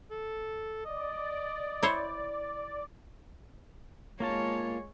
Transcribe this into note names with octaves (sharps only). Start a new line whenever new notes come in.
A4
D5 D#5
E4 C5 C#5
G#3 A#3 F4 C#5 A5